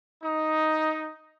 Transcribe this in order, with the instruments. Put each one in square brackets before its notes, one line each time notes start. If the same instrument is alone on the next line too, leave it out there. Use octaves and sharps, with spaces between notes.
[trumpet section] D#4